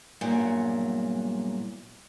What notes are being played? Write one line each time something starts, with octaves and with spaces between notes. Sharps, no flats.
E2 G2 A#2 F#3 G#5